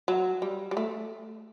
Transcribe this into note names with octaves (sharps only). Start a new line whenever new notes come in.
F#3
G3
G3
A3